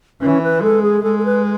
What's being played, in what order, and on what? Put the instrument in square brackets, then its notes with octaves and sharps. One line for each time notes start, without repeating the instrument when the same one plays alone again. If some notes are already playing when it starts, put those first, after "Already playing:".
[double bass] E3 [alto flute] C#4
[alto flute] B4
[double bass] G#3 [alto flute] A4
[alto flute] G#4
[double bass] G#3 [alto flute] A4
[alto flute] A4
B4